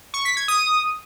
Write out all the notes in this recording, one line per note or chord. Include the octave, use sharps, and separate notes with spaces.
C#6
B6
G#6
D#6